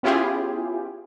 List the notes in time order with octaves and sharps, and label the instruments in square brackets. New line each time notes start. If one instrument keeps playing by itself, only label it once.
[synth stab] B3 C#4 E4 F4 G4 G#4